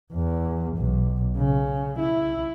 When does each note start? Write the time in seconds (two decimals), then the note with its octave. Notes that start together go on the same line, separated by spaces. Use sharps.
0.13 E2
0.77 B1
1.38 C#3
1.99 E4